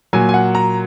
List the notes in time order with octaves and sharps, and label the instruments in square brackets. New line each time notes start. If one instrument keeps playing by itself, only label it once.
[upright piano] A#2 F#3 G#5
G#5
F#5
A#5